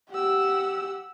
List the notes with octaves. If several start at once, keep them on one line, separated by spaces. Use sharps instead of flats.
G4 F#5 E6